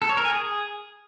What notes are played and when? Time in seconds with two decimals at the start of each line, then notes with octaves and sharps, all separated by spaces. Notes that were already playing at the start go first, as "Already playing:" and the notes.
0.02 A4
0.09 C#5
0.17 A#4
0.25 G#5
0.33 G#4